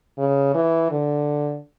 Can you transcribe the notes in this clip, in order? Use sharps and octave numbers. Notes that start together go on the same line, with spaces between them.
C#3
E3
D3